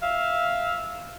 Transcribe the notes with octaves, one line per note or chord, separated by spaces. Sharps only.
E5 F5